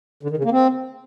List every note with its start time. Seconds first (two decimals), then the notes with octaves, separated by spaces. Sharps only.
0.23 D3
0.30 D#3
0.37 C#3
0.44 A#3
0.51 C4